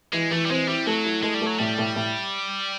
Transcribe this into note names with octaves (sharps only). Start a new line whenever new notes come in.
E3 G#3
E3 A3
G3
G#3 C4
G3 E4
F#3 A3
E4
G#3 A3
G3
A3
F#3
A2 G3
A2
A2